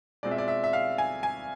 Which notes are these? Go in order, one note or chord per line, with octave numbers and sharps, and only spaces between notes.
B2 G#3 C4 F4 D5
E5
D5
E5
E5
F5
G#5
G#5